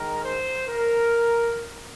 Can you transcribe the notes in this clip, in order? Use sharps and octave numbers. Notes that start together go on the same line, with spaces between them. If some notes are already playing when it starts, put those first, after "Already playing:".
Already playing: D#3 G#3 A#4
C5
A#4